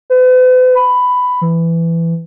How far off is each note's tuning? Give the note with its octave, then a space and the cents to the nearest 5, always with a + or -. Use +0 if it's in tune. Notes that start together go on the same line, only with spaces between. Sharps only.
B4 +45
B5 +10
E3 +15